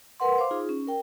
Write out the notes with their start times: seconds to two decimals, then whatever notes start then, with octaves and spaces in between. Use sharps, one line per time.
0.20 A#4 B4 F#5 C6
0.38 C5 F5 C6 D6
0.51 D#4 F4 G#4
0.69 C#4
0.87 A#4 G5